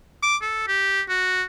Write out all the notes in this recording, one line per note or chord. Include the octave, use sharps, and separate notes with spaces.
D6
A4
G4
F#4